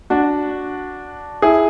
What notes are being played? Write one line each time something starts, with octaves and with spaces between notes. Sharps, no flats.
D4 F#4
E4 G#4